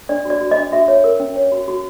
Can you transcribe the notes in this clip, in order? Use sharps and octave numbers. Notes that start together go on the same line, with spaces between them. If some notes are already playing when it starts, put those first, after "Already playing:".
D4 D5
F#4 D5
F#4
D#5
D4
F#4 E5
C#5
A#4
C#4
C#5
F#4
F#4